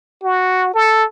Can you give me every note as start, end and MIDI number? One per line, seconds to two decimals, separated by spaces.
0.24 0.72 66
0.74 1.04 69